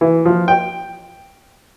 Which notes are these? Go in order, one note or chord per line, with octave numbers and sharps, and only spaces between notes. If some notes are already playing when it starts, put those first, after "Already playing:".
E3
F3
G5